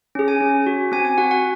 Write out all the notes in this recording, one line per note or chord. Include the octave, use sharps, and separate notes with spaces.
C#4 G#4
G#5
C#4
F#4
C4 G#5
G#5
F#4 F#5
F#5